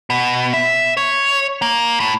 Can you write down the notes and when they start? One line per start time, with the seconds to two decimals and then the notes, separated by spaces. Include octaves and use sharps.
0.10 B2
0.53 E5
0.97 C#5
1.62 A#3
2.00 A2